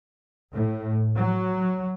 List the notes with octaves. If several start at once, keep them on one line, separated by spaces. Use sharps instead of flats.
A2
F#3